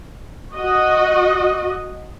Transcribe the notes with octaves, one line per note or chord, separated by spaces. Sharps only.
F#4 D#5